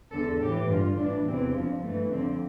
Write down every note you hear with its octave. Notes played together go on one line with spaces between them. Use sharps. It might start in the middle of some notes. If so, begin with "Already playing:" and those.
E2 D3 A4
A2 E3 G4
G2 D3 F4
A2 E3 D4
E2 C3 E3 C4
F2 D3 F3
G2 E3 A3
F2 D3 C4